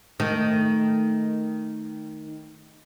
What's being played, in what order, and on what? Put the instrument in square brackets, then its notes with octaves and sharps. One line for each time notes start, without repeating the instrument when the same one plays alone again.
[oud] D#3 A3